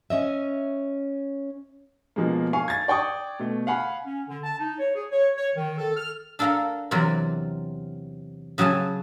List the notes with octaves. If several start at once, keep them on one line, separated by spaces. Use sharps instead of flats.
C#4 D#5 E5
B2 F3 G#3 A#3
F5 G#5 C#6
G#6 A6
D5 G5 C#6 D#6
B2 A3
F5 F#5 G#5 B5
C#4
D3
A5
D#4
C#5
G#4
C#5
C#5
D#3
A4
F6
D4 A4 A#4 F5 F#5 A#5
E2 C3 F#3 A#4 D5 A#5
C#3 F#3 G#4 G#5 A5